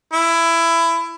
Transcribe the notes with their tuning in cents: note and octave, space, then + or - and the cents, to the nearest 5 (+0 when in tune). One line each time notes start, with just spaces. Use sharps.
E4 +20